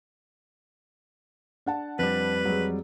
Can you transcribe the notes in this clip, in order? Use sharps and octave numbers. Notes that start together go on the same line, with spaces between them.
D4 F#5 A5
F2 G3 B4
F#3 G#3